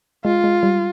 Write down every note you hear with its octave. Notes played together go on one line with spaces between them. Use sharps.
G#3 F4
G#3
G3